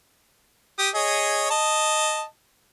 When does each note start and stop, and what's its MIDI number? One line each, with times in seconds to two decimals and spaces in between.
0.79 0.89 67
0.79 0.89 87
0.95 1.50 68
0.95 1.50 73
0.95 1.50 75
1.51 2.24 75
1.51 2.24 81